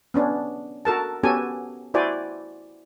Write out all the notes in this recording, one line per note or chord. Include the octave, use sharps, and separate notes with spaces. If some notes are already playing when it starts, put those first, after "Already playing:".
B3 C#4 D4
F#4 A4 A#4 A5
B3 C#4 F#4 G4 A4 G#5
E4 F#4 C5 D5 G#5